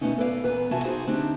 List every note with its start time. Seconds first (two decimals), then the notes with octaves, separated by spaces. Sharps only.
0.01 B2 F3 A3 B3 C#4 D#4
0.18 A4 B4 D5 D#5 F5
0.43 E2 A#2 B3 B4
0.71 B2 F4 F#4 E5 G#5 A5
0.84 B3 D#4 F4 F#4 G#4 C5
1.07 D3 A3 C4 D4 D#4 G4